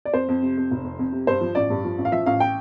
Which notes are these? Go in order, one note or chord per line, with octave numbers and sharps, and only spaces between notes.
D5
F2 C5
F2
C3
F2
F1
F2
F2
C3
G2 C5
F3
A1 D5
G2
F3
A1
F5
F3 E5
A1 F5
G5